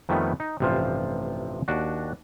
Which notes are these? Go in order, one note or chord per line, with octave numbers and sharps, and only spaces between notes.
F2 D#3 F3 G3 A3 B3
D#4
A1 G2 C3 F3 F4 C5
D#2 D4 F#4